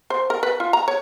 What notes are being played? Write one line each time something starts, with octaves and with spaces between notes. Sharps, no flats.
C5
A#4
B4
F4
A#5
C#5